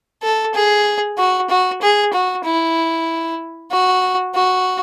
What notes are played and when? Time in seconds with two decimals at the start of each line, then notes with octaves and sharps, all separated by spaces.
0.23 A4
0.54 G#4
1.18 F#4
1.50 F#4
1.81 G#4
2.13 F#4
2.45 E4
3.72 F#4
4.35 F#4